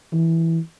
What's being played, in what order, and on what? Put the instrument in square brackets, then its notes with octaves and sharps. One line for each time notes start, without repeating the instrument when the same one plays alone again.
[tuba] E3